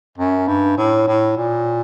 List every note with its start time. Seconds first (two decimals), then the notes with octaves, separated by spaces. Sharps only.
0.18 F#2
0.48 G2
0.78 A2
1.07 A2
1.37 A#2